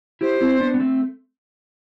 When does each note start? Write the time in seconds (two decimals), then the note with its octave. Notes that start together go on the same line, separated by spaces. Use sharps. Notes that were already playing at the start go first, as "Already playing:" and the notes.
0.21 E4 G4 C5
0.41 C4 E4
0.60 B3 D4
0.74 B3
0.80 A3 C4